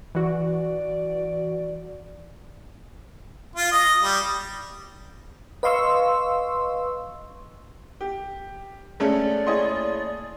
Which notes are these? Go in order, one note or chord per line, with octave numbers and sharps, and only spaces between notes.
E3 F#4 D5
F4
D#5
G3
B4 D#5 F5 C6 C#6 E6
G4
G#3 A3 C#4 D5
A#3 E4 G#4 C#5 D#5 C6